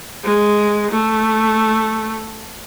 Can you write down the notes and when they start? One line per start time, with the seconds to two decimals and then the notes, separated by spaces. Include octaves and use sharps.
0.24 G#3
0.91 A3